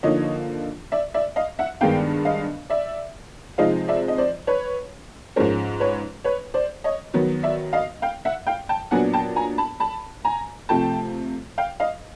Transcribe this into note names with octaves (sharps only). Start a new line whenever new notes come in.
D3 F3 A#3 D#4 C#5 D#5
D5 E5
D5 E5
D#5 F5
E5 F#5
G2 D#3 G#3 B3 D4 F5 G5
D#5 F5
D5 E5
C3 F3 G#3 C4 D#4 D#5 F5
D5 E5
D#5
C5 D5
B4 C#5
G#2 F3 G#3 C#4 A#4 C5
B4 C#5
B4 C#5
C5 D5
C#5 D#5
D#3 F#3 B3
D5 E5
D#5 F5
F5 G5
E5 F#5
F5 G5
G5 A5
A#2 F#3 B3 D4 F#5 G#5
G5 A5
G#5 A#5
A5 B5
A5 B5
G#5 A#5
C3 F3 A3 G5 A5
F5 G5
D#5 F5